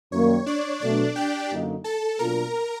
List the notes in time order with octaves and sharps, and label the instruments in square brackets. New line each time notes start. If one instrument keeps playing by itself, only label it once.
[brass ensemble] F#2 D#3 G3 A#3 [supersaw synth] C#5
[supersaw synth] D4 D5
[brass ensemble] B2 F#3 A3 [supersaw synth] D4 D5
[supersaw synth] G4 G5
[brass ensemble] F#2 D3 F#3 A#3 D#4
[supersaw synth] A4 A5
[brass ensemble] B2 F#3 A#3 D4 F4 [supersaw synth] A#4 A#5